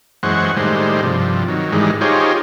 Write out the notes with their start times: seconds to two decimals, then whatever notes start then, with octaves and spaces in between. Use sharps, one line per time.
0.23 F#2 E3 G#3 C5 F#5 C#6
0.57 A2 D#3 G3 G#3 C5
1.03 G2 C3 F3
1.48 D#3 F#3
1.73 G#2 D#3 E3 G3 G#3
2.01 D#4 F4 G4 G#4 C5 C#5